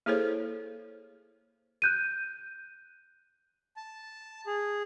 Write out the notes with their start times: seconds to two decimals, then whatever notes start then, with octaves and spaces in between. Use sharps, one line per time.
0.06 A#3 E4 G#4 A4 C5 C#5
1.82 F#6 G6 D#7
3.77 A5
4.47 G#4